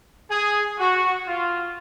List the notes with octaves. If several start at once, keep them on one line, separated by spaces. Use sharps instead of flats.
G#4
F#4
F4